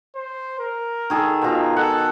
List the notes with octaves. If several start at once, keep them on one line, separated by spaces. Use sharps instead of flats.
C5
A#4
D#3 G#4 A4
B2 F4 A#5
A4 F#5